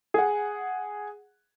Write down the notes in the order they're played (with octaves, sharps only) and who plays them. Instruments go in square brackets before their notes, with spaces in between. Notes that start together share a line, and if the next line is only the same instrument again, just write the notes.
[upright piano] G#4 F#5